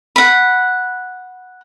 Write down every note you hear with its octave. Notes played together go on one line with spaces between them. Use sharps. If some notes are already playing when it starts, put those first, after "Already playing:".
F#5 B5